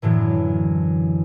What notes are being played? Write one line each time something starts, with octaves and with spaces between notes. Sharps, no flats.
F#2 A2 D3 E3